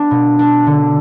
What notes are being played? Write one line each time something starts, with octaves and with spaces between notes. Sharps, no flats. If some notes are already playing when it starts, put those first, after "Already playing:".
Already playing: B3 D4
B2
D4
D3